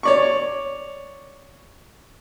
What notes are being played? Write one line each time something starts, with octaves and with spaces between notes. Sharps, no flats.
C#5 D5 C#6